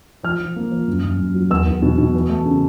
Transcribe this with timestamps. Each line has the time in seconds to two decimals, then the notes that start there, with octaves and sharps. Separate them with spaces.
0.23 F3 F6
0.40 F3
0.56 A#3
0.72 F3
0.88 F#2
1.04 F#2
1.18 F#2
1.34 F#3
1.50 E2 E6
1.67 E2
1.82 B2
1.98 B2
2.15 E3
2.30 A3
2.46 C#3